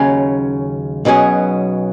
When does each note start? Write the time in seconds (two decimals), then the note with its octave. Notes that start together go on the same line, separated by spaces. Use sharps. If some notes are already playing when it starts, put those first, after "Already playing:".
Already playing: D#2 C#3 F#3 C#4
1.05 B1 B2 F#3 C#4 G#4